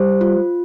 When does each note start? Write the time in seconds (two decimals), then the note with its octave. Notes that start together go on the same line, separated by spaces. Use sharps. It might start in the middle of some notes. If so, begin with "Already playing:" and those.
Already playing: G3 C5
0.21 F4